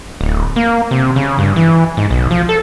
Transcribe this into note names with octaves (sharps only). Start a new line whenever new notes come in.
D1
A#3
C3
C#3
G2
E3
G#2
B1
F3
A4